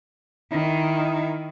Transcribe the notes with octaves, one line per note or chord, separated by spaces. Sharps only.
D#3 E4